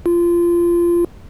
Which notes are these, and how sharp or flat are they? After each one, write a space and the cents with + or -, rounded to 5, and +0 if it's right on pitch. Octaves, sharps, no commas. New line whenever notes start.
F4 -20